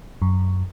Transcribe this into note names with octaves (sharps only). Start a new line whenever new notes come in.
F#2